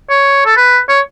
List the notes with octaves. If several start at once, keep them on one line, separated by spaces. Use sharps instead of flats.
C#5
A4
B4
C#5